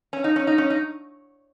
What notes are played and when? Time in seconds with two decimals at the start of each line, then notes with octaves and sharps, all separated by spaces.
0.13 C#4
0.24 D#4
0.36 C#4
0.47 D#4
0.58 C#4
0.70 D#4